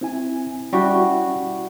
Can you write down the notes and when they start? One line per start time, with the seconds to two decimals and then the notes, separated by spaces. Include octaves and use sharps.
0.01 C4 E4 G#5
0.73 G3 C#4 E4 F#4 E5